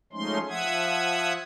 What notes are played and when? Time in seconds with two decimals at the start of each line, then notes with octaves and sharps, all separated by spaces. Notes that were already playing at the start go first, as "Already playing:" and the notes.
0.13 F3 G#3 A3 C#4 D#4 C6
0.48 F3 E5 F#5 D#6 G#6